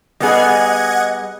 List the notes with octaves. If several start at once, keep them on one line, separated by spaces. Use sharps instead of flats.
G3 B3 G#4 D#5 F#5 G#6